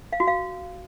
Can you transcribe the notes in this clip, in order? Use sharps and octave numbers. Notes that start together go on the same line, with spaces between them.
F5
F#4
F5